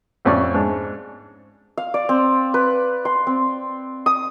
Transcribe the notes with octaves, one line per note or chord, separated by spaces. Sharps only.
A1 F2 C#4 D5 C#6
G#2 D4
F5
D5
C4
B4
C6
C4
D#6